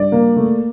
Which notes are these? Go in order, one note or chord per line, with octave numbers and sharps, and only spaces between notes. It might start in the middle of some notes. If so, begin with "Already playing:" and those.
Already playing: G2 D5
A#3
A3